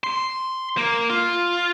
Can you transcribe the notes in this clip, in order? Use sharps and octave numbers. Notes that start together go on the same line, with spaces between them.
C6
A#3
F4